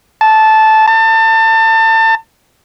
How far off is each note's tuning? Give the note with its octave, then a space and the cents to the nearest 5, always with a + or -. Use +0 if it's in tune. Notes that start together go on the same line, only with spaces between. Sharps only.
A5 -10
A5 +30